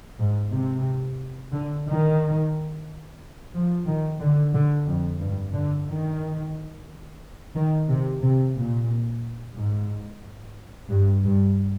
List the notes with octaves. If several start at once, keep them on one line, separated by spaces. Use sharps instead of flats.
G#2
C3
D3
D#3
F3
D#3
D3
D3
F2
G2
D3
D#3
D#3
C3
C3
A#2
G#2
G2
G2